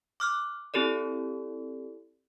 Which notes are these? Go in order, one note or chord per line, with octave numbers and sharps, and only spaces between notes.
D6 F6 F#6
C4 E4 G4 A4 D5